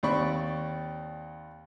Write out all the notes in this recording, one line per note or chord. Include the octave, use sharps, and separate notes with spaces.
D#2 C4 D5 B5 C#6